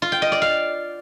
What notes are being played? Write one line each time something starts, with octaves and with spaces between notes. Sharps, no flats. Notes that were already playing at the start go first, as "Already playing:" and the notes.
F4
G5
D#5
D5
F5